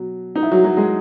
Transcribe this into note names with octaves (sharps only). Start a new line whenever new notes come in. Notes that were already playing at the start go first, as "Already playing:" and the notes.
Already playing: B2 F#3 F#4
D#4
E4
F#3 F#4
F#3 F#4
G#3 G#4